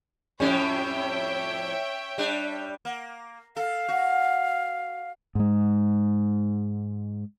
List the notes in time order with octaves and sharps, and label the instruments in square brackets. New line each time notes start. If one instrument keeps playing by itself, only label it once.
[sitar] F2 A2 G3 [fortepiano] C#4 [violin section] C#5 E5 G5
[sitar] G3 D4
A#3
[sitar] A4 [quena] F5
[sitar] F#4
[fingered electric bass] G#2 G#3